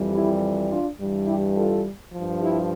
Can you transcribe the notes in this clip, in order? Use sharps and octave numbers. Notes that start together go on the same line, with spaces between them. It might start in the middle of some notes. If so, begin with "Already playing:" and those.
Already playing: F2 E3 G3
E4 G4
D4 F4
G2 E3 G3
E4 G4
F4 A4
G2 F3
E4 G4